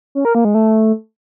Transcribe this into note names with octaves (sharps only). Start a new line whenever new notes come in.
C#4
A#4
A#3
G#3
A3